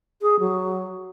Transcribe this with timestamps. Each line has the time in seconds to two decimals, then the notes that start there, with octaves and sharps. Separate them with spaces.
0.22 G#4
0.40 F#3